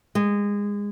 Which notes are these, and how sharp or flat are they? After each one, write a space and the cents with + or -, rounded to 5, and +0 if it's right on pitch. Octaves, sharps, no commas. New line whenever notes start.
G#3 -25